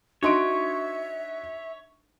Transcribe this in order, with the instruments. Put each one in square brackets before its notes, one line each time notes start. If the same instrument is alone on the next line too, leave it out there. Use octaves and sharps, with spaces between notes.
[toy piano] D4 D#4 C6 [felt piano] F#4 D#5 D7 [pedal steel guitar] C#5 [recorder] E5